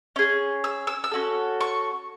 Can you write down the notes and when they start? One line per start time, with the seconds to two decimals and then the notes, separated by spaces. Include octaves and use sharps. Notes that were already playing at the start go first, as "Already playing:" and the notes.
0.16 C#4 G#4
0.64 E6
0.87 E6
1.04 E6
1.11 C#4 F#4 A4
1.61 C#6